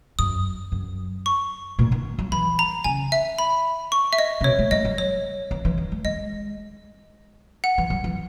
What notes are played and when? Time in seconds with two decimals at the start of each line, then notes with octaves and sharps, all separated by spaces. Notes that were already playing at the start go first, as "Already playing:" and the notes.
0.19 F#2 D#6
0.72 F#2
1.26 C#6
1.79 A#2
1.92 D#3
2.19 F#3
2.32 E3 B5
2.59 A#5
2.84 C#3 G#5
3.12 E5
3.39 B5
3.92 C#6
4.13 E5
4.18 D#5
4.41 C#3
4.44 B2 C#5
4.59 G#3
4.71 G#3 D#5
4.85 F#3
4.98 C#5
5.51 E3
5.65 E3
5.78 D#3
5.92 G#3
6.04 G#3 D#5
7.64 F#5
7.78 E3
7.90 F#3
8.04 E3